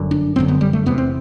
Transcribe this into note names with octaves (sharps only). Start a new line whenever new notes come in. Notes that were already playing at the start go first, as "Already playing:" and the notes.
Already playing: G1 F#2 D3
D4
G1 F#2 D3 C4
B3
G3
A3
E1 E2 C3 B3
C4